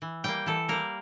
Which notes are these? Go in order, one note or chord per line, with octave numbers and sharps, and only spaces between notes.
E3
G3 A#3 G5
E3 A4
G3 A#3 A#4